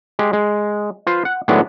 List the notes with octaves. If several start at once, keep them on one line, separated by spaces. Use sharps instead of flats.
G#3 G4
G#3
F4 B4 C5
F#5
A2 D#3 F#3 G#3 B3 D4